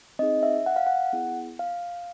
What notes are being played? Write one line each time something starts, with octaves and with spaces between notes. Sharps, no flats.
C4 D#4 G#4 D#5
E5
F#5
F5
F#5
B3 E4 G#4
F5